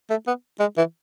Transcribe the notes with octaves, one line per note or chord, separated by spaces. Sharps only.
A3
B3
G#3
E3